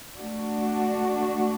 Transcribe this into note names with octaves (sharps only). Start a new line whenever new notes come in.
A3 D4 F#4